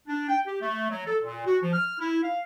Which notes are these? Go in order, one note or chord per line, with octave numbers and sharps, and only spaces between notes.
D4
G5
G4
A3
F#3
A4
A#2
F#4
F3
F6
E4
F5